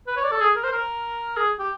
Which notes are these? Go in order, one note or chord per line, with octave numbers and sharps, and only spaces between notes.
B4
C#5
D5
A4
G#4
A#4
C5
A#4
G#4
G4